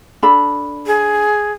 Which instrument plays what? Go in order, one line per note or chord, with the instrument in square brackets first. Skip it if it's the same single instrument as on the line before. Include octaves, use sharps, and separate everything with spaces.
[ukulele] D4 A4 B5
[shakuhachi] G#4